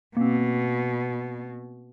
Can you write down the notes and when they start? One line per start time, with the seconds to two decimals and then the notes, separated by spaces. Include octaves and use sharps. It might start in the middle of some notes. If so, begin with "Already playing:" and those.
0.17 B2 A#3 C4